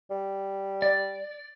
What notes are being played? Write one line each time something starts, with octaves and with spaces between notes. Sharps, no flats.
G3
D5